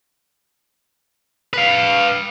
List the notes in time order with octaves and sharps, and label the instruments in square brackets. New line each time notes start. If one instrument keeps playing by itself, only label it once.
[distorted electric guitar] B4 F5